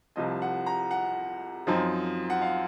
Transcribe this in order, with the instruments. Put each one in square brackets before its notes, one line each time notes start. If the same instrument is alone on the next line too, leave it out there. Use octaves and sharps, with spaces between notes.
[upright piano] C2 C3 F3 D#5
F#5
A#5
F#5
F#2 F3 C4 D#4
F#5
F5